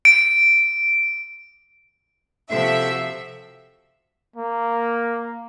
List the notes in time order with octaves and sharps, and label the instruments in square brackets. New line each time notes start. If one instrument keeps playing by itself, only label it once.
[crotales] D7
[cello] C3 F3 [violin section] F#4 E5 [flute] A4
[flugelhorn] A#3